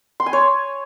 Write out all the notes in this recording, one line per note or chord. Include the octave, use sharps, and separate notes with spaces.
C6
G#5
C#5